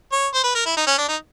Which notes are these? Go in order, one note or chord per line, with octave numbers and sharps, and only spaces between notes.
C#5
C5
B4
A#4
E4
D#4
C#4
D4
D#4